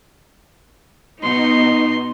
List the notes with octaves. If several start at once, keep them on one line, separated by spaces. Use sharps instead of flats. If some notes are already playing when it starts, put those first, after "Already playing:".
B2 D#4 C6